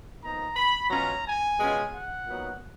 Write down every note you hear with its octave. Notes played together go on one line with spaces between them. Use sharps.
A#2 F3 B3 D#4 A#5
B5
B2 F#3 C#4 F4 A#5
G#5
B2 G#3 C#4 F4
F#5
A#2 F#3 B3 D#4